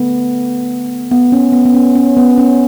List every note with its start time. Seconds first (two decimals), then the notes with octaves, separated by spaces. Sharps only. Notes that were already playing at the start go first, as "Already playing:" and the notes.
Already playing: D3 A3 B3
1.11 B3
1.32 C#4
1.52 B3
1.65 B3
1.74 C#4
1.95 C#4
2.17 B3
2.38 C#4